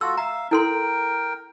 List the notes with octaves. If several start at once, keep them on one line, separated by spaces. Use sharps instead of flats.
F4 F#4 A4 E6
E5 F5 A#5
E4 A4 A#4 G5 C6